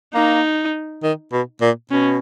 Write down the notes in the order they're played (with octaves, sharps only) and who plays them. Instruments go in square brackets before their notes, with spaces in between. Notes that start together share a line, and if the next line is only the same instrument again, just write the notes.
[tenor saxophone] A#3 [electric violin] D#4
[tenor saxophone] D#3
B2
A#2
[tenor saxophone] B2 [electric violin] C#4